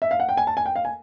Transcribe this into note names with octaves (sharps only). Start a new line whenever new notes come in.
E5
F5
F#5
G5
G#5
A5
G#5
G5
F5
G#5